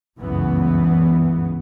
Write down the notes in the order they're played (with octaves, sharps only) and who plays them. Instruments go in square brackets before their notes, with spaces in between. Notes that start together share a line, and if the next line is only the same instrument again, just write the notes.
[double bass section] F#1 C#2 G2 C#3 E3 B3